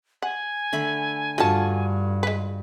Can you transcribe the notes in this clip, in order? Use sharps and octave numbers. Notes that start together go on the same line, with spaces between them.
F#5 G#5
D3 A3 B5
G2 A3 F4 F#4 A5
G#3 B4